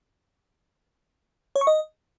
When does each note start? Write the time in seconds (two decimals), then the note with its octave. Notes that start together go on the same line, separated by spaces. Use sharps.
1.56 C#5
1.61 C#6
1.67 D#5